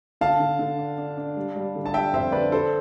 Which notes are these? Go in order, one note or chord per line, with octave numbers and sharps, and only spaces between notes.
D3 F5 A5
D3
D3
D4
D4
D4
G3
G3
D3
A5
G3 E5 G5
F2 C5 E5
D3 B4 D5
D4 A4 C5